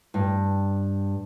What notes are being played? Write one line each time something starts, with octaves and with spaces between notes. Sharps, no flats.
G2